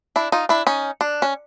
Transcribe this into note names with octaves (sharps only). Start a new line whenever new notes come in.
D4 E4
D#4 F4
D4 E4
C#4 D#4
D4
C#4